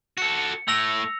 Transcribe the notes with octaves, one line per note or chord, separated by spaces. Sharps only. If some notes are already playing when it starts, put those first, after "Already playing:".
F#4 A4 C#7
A2 A3 E6 A#6 F7